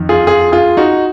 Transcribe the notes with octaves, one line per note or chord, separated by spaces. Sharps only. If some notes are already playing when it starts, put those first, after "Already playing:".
Already playing: F2 D#3
F4 G#4
F4 G#4
F4 G#4
D#4 F#4